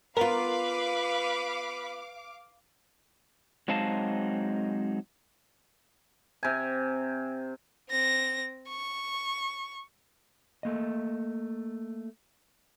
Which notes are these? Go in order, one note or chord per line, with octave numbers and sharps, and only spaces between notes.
B3 F4 A#4 B4 F5 D6
F#3 G#3 C4 D#4 F5 A5
C3 G#5
C4 A#6
C#6
A3 A#3 D#5